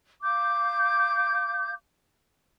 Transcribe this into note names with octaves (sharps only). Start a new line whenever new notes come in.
F5 D6 G6